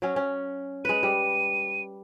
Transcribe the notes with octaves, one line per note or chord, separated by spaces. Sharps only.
F#3 C#4
C#4
G#3 B4 D#7
G3